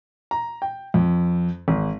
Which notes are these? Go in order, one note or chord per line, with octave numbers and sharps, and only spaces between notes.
A#5
G5
F2
G#1